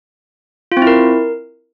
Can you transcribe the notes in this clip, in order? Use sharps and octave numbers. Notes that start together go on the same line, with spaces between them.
F4
C4
E4
A#4